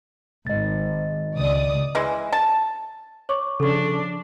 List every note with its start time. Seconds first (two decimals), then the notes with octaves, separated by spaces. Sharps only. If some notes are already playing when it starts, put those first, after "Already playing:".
0.47 G#1 D#5 A6
1.35 C#2 D5 D#6
1.95 E3 G#3 E4
2.32 A5
3.29 C#5 C#6 D6
3.60 C#3 F3 D4 A4 C#6